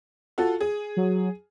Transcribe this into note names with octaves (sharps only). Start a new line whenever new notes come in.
F4 F#4 A4
G#4
F#3